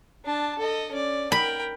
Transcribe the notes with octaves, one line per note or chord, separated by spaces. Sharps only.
D4 A5
A4 D#5
C#4 D5
A#4 G5 B5